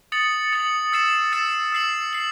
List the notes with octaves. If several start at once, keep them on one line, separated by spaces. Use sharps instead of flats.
D#6 A6 C#7 F#7
D#6 A6 C#7 F#7
E6 A6 C7 E7
E6 A6 C7 E7
E6 C7 F#7
C7 F#7